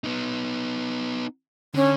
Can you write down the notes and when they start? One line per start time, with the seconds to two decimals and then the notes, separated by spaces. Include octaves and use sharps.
0.04 B3 D#4
1.75 D3 C#4